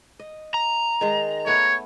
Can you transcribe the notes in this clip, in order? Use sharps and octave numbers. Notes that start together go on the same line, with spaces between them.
D#5
A#5
D#3 G#3
A3 B3 C#5 F#5